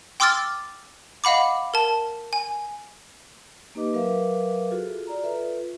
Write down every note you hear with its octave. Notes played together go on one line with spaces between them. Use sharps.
G5 C6 D6 E6 F6 A6
D#5 F5 F#5 B5 D6
A#4 A5
G#5
A#3 D#4 G4 B4 D#5 D6
F#3 A#4 B4 E5 F5 D6
F4 F#4 G#4 A4
F4 D5 A#5
F4 A4 B4 E5